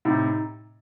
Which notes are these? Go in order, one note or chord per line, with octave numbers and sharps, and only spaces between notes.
A2 C3 D#4